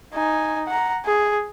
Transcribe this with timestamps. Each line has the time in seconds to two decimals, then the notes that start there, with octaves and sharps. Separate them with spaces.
0.14 D#4 G#5
0.67 F#5 A#5
1.06 G#4